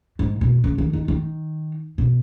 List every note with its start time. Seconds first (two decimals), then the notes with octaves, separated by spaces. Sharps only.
0.19 G#2
0.41 B2
0.64 C#3
0.78 D#3
0.93 D#3
1.08 D#3
1.98 B2